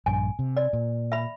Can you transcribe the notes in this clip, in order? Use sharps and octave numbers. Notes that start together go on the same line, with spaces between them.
A#1 G2 G#5
C3
D5
A#2
E5 B5